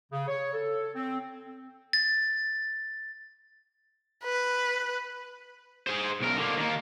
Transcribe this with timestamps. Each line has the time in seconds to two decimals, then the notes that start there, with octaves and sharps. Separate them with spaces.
0.12 C#3
0.28 C#5
0.53 A4
0.96 C4
1.93 A6
4.24 B4
5.87 G#4 C5
6.21 B1 A#4
6.38 D3 A#3
6.57 D#3 A#3